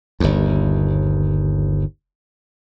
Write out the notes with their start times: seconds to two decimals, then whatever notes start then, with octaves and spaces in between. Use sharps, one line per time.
0.20 G1 D#2